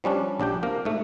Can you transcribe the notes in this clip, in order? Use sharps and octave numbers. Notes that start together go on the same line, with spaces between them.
F3 G3 C#4 D4
A#1 D4 G4 G5
C3 A#3 A#4
G#2 A3